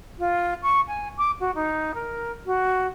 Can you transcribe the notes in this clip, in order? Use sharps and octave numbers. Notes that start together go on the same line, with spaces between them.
F4
C#6
G#5
D6
F#4
D#4
A#4
F#4